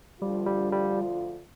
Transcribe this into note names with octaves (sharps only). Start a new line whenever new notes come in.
D2 D3 F3 G3 D4 F4
G3
G3